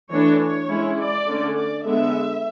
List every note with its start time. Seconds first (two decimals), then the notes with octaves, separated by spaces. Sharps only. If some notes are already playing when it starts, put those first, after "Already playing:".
0.11 E3 A3 D4 C#5
0.40 C#5
0.69 G#3 C#4 E4
0.98 D5
1.26 D3 A3 C#4
1.55 D5
1.84 D3 G#3 B3 E5